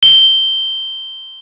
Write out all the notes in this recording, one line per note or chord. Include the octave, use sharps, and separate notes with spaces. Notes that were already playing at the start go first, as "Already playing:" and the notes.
G7